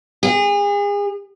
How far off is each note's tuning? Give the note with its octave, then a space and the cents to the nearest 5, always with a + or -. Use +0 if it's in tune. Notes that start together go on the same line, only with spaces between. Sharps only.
G#4 -35